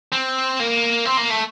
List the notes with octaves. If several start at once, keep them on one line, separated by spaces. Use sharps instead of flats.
C4
A#3
C4
A#3
A3